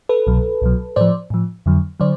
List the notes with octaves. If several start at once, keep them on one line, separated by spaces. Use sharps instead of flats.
A4 B4
C2 B2 F#3
C2 B2 F#3
A2 F3 C5 D5
A2 F3
F2 D3 F#3
D3 F#3 C5 D5